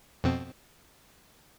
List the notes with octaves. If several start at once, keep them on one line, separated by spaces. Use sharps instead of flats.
F2 B2 C4